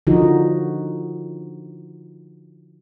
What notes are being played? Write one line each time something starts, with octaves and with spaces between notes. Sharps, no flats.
D3 F3 D#4 F#4